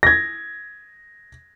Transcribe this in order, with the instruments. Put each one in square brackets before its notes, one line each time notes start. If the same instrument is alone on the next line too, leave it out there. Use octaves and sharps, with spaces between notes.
[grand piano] G#6 A#6